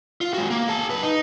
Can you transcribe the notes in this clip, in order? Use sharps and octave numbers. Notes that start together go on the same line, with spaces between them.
F4
G#3 F#4
A#3
G#4 A5
F#2 B4
D#4